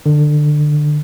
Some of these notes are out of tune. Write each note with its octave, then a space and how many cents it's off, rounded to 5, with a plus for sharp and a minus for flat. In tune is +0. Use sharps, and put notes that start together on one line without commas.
D3 +20